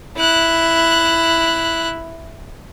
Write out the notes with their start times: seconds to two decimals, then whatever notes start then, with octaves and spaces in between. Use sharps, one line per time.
0.17 E4 F#6